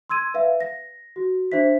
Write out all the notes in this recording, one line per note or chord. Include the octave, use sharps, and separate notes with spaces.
C6 E6 G#6 D#7
B4 E5 F5
A#6
F#4
D4 C5 E5 B6